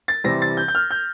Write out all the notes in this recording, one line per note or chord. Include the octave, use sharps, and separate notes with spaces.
A6
C3 E3 G3 C4 A#6
A6
G6
G6
F6
G6